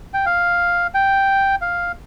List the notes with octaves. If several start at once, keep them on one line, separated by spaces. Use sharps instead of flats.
G5
F5
G5
F5